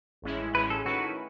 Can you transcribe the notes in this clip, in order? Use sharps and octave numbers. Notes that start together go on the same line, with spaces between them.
A1 A2 G#3 C#4 E4
A1 A2 G#3 C#4 E4 B4
A4
D#3 A3 C#4 E4 F#4 B4